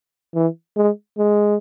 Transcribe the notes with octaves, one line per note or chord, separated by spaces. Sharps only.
E3
G#3
G#3